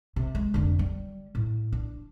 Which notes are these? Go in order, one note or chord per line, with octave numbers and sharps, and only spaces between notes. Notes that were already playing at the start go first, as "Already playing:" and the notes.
C3
G#3
F1 D3
G3
A2
D4